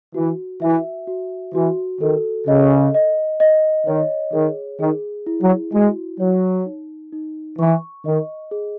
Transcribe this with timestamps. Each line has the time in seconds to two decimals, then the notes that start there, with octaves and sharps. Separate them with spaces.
0.14 E3 F#4
0.62 E3 E5
1.07 F#4
1.54 E3 F#4
2.01 D#3 A4
2.47 C#3 D#5
2.94 D#5
3.40 D#5
3.87 D#3 C#5
4.33 D#3 G#4
4.80 D#3 G#4
5.27 E4
5.42 F#3
5.73 G#3 F#4
6.19 F#3 C#5
6.66 D#4
7.13 D#4
7.59 E3 C#6
8.05 D#3 D#5
8.51 G#4